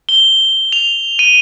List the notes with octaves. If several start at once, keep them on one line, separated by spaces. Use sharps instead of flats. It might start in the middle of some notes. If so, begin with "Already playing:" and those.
G7
F7
D#7